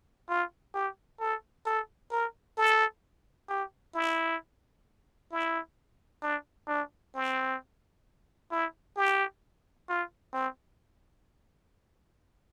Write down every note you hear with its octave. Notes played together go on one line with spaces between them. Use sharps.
F4
G4
A4
A4
A#4
A4
G4
E4
E4
D4
D4
C4
E4
G4
F4
C4